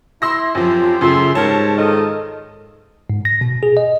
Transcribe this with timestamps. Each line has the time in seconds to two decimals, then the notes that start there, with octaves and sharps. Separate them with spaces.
0.22 E4 C6 E6 A#6
0.55 F#2 F3 C4 F4 G4 C5
1.01 F#2 C#3 A3 E5 C6
1.35 G#2 G3 A#4 C#5 A5
1.77 D#3 F4 A4 D#5
3.10 G#2
3.25 A#6
3.41 B2
3.63 G#4
3.77 D#5